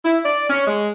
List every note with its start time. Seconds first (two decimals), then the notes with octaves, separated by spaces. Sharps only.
0.05 E4
0.25 D5
0.50 C#4
0.67 G#3